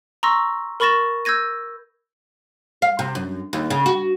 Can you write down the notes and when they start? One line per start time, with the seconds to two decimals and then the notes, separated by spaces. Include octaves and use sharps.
0.23 A#5 C6 C#6 E6 A#6
0.80 A#4 B5 C#6 A6 A#6 E7
1.25 E6 G6 G#6 A#6 D#7
2.82 F5
2.99 C3
3.15 F#2
3.53 D#2
3.70 C#3
3.86 F#4